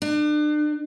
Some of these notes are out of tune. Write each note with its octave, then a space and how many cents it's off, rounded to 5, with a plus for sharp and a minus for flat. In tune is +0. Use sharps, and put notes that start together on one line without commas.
D4 +35